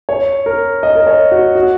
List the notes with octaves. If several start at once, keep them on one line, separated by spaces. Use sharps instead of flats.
C#5
A#4
D#5
A#4
C#5
F#4
F#4